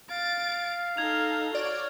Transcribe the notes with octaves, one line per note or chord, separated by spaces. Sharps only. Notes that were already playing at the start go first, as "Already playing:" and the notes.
F5 A6 D7
D#4 A4 F6 G#6 F7
F#4 C#5 D5